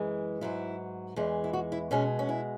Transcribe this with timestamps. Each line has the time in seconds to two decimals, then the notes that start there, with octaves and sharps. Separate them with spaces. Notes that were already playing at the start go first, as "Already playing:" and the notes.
Already playing: F#2 E3 G#3
0.41 G#2 F#3 E4
1.16 E2 E3 G#3
1.44 E4
1.53 F#4
1.72 E4
1.91 B2 G#3 C#4
2.19 C#4
2.29 E4